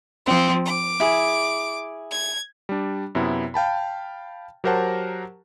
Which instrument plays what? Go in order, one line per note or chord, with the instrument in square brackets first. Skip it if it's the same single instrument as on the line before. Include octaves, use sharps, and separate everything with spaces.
[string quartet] F3 C4
D6
[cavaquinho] E4 G#4
[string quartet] G#6
[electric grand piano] G3 D4
F#2 C3 B3 E4
F5 G5 A5 B5
F#3 G4 A#4 C5 F#5 A5